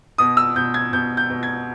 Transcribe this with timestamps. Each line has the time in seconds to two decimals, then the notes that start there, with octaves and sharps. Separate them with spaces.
0.18 B2 D#6
0.37 E6
0.56 B2 G6
0.74 G#6
0.93 B2 G6
1.17 G6
1.30 B2
1.43 G#6